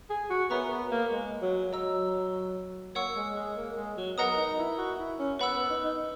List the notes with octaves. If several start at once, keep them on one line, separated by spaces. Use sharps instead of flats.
G#4
F#4
B3 A#4 C#5 E5 A#5 C#6
B3
A#3
G#3
F#3
F#3 D#5 A#5 E6
A#3 C#5 F#5 C#6 E6
G#3
G#3
A#3
G#3
F#3
B3 A#4 D#5 F#5 A#5 D#6
D#4
E4
F#4
E4
C#4
B3 B4 F#5 B5 E6
B3
D#4
D#4